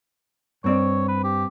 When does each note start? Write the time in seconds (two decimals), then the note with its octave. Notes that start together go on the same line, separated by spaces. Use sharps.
0.64 G2 C4 C#5 D5
1.08 B4
1.24 G4